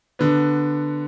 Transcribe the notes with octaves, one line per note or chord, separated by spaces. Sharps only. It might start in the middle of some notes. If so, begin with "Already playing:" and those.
D3 B3